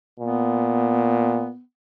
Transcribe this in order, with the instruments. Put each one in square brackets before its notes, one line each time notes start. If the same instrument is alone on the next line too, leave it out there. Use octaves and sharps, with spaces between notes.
[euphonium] A#2 [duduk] B3